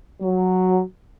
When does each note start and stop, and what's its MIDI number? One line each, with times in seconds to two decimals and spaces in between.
0.22 0.81 54